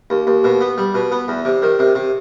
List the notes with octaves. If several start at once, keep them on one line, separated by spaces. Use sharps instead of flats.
D#2
D#2
B2
B3
G3
B2
B3
E2
C3
D#3
C3
C3